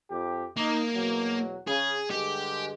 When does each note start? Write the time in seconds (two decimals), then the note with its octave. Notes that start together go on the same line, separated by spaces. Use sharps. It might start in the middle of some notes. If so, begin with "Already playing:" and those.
0.11 F2 G4
0.57 A#3 D#4
0.94 E2 B2 F#3
1.68 C#3 G#4
2.11 G2 D3 G#3 G4